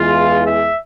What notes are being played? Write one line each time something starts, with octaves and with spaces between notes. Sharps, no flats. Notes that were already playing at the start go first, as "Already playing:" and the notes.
Already playing: E2 E3 G#3 F4
E5